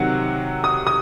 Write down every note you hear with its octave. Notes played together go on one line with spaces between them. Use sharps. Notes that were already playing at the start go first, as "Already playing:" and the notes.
Already playing: C3 D#3 F#3 F#5
D#6
D#6